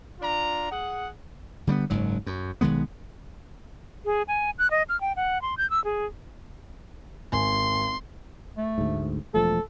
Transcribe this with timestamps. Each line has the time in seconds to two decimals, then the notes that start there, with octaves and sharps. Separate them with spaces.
0.20 D4 F4 A#5
0.71 G#4 F#5
1.67 D3 G3 A3 B3
1.90 F#1 G#2 F#3
2.26 F#2
2.61 B1 D#3 G#3 B3
4.05 G#4
4.28 G#5
4.59 F#6
4.71 D#5
4.89 F6
5.01 G5
5.16 F#5
5.42 C6
5.58 G6
5.70 E6
5.85 G#4
7.33 G#1 G#5 C6
8.57 A3
8.78 D2 G#2
9.34 E1 F3 A3 A4